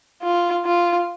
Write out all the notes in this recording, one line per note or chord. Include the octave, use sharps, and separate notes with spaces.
F4
F4